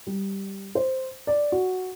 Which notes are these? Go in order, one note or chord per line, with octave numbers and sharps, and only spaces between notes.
G3
C5
D5
F#4